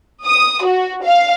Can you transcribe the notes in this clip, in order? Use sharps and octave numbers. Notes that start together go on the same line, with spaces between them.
D#6
F#4
F5